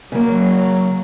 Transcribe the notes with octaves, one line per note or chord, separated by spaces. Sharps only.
C#3 F#3 A#3